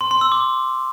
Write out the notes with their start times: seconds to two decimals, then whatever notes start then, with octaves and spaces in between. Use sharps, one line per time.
0.01 C6
0.11 C6
0.21 E6
0.32 D6